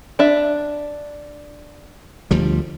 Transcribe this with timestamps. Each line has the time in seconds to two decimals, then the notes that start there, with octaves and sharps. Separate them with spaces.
0.19 D4 E5
2.31 D2 F3 G3